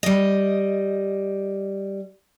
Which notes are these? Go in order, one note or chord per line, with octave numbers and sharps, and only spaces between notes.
G3 D#5